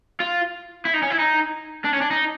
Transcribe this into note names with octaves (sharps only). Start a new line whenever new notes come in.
F4
E4
D#4
C#4
E4
D#4
D4
C#4
D4
D#4